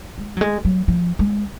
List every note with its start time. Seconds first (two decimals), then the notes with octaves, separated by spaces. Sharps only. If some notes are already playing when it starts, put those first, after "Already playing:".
0.18 G#3
0.37 F#3
0.41 G#3
0.65 F#3
0.88 F3
1.19 G#3